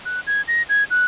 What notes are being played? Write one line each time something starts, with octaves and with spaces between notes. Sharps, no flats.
F#6
G#6
A#6
G#6
F#6